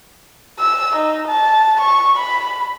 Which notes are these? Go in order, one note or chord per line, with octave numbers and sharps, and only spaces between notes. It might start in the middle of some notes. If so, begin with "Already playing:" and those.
E6
D#4
A5
C#6
B5